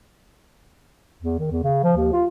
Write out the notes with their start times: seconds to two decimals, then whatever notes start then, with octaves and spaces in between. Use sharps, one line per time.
1.22 E2
1.39 D#3
1.51 E2
1.63 C#3
1.83 F3
1.96 D#2
2.13 F4